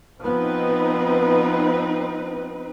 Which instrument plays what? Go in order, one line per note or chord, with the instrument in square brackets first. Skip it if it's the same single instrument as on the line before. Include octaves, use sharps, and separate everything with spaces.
[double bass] F3 B3 [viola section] C4 D#4 B4